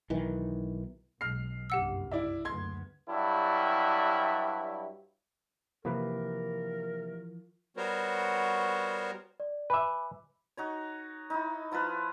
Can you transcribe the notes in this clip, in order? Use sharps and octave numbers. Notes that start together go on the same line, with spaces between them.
B1 D#3 E3
B1 B2 G#3 F6 C7
F#1 C2 G2 G4 F#5 E6
E4 D5 E5
F#1 D2 B3 C6 G#6
G2 F#3 G3 E4
C3 E3 F3 A#3 A#4 B4
G3 B3 F#4 A#4 C5 C#5
D5
B4 E5 G#5 B5 D6
D#4 F#4 C#5
D#4 E4
F3 E4 F4 B4